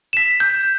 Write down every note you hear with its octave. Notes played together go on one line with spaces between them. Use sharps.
B6 E7
G6